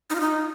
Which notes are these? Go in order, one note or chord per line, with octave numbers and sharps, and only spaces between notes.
D#4
F4
D#4